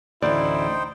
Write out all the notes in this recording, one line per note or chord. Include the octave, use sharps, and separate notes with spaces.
A1 D2 D#4 E4 C5 D5 G5